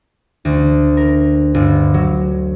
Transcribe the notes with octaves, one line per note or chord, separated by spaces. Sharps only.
D2
A#4
G1
F#3